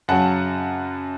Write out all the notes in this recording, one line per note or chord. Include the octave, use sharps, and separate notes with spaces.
F#2 C#3 F#3 F#5 A5